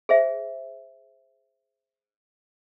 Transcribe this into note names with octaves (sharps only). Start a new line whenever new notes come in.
G#4 C5 E5